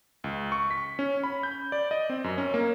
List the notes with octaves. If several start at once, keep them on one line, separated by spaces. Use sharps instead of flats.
C#2
C#6
B6
C#4
B5
G6
D5
D#5
C4
F#2
C#4
A#3